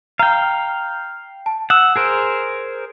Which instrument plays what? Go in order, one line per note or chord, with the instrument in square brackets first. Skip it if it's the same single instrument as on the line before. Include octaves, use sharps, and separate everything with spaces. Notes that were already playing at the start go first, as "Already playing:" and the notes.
[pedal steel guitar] F5 G5 [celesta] A#5
[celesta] A5
[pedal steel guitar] F#5 [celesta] D#6 E6 E7
[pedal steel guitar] G#4 A#4 C5